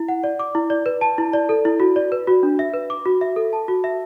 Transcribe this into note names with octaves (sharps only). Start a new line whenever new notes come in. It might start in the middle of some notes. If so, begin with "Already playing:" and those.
Already playing: E4
F#5
D5
D6
E4
D5
B4
A5
E4
D5
A4
E4
F#4
D5
B4
F#4
D4
E5
B4
D6
F#4
E5
A4
A5
F#4
E5